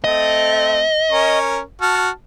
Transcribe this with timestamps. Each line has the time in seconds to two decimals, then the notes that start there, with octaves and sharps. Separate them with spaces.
0.04 A3 C4 D#5 A5
1.11 C#4 A#4 C#6
1.81 F#4 A5 F6